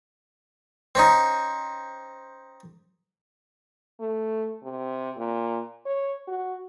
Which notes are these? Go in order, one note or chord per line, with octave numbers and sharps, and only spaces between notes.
C4 C#4 D#4
A3
C3
A#2
C#5
F#4